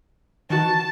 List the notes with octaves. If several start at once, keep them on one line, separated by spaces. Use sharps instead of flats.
D#3 E3 F#4 A5